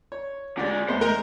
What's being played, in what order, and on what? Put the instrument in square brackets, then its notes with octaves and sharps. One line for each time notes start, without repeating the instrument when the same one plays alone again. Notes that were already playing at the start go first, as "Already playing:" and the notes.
[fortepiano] C#5
[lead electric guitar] D3 G#3 [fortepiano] G4 D5
[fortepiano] E2 G#3 B3 [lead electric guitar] C5
[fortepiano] G#3 [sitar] A#4